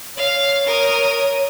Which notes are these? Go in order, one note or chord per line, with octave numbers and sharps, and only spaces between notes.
C#5 F5
A#4 D#6